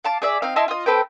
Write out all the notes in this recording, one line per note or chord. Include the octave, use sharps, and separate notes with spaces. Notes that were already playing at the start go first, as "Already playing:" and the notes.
F5 A5 D6
G#4 D5 E5
C4 D#4 F5
E4 D#5 A5 C6
F4 D#5
C4 A4 B4 G5